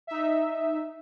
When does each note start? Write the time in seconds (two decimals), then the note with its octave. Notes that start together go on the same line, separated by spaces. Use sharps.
0.07 D#4 E5